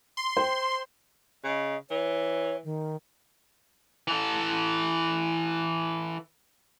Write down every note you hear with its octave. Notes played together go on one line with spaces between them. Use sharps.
C6
C5 G5
C#3 D#5
E3 C#5
D#3
E3 A4